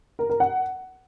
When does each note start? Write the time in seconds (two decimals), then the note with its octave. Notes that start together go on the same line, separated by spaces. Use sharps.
0.19 A#4
0.30 A#4
0.40 F#5